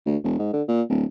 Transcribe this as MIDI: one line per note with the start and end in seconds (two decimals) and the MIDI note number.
0.06 0.17 38
0.24 0.36 28
0.39 0.51 44
0.53 0.62 50
0.68 0.82 46
0.89 1.05 26